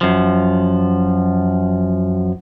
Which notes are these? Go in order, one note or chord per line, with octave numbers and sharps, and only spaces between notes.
F#2 F3